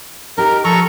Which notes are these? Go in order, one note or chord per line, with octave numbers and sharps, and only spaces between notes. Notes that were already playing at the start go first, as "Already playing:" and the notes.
D#4 G4 A#4
F3 A4 A#5 C#6